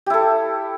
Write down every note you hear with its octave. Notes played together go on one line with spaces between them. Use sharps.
E4 G4 A4